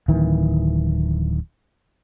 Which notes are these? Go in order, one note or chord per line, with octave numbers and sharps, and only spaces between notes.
D1 D#3 E3